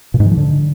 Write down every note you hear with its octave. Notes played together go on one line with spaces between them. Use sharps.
A#2
G#2
E3
F3
D3